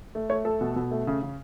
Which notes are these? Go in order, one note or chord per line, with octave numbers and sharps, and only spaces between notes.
A3
A3 C#5
A3 A4
B2
B2
A3
C#3
C#3